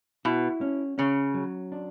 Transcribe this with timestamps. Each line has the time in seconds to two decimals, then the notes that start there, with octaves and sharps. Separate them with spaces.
0.25 B2 E4
0.61 C#4
0.98 C#3 C#4
1.34 F#3
1.72 D4